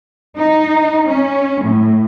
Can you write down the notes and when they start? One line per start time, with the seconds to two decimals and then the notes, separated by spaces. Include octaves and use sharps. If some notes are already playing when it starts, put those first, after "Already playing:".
0.37 D#4
1.08 C#4
1.64 A2